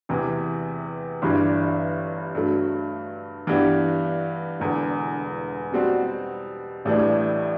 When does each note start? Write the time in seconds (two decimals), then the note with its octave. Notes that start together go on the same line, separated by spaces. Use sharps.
0.09 E2 C3 E3
1.22 G1 G2 E3 G3 D4
2.35 G2 F#3 A3
3.47 G2 E3 B3 D4 G4
4.60 E1 E2 D3
5.72 B2 G3 C4 F#4
6.85 A1 A2 E3 G3 D4